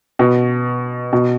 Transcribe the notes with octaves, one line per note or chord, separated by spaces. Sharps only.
B2
B2